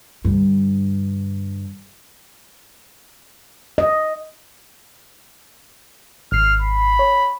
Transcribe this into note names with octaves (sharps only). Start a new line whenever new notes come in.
G2 D3
D#5
G#1 F6 C7
B5
C#5